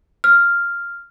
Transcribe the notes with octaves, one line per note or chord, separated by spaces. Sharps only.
F6